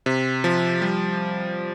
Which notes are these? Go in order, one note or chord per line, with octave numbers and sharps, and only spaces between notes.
C3
F3
G3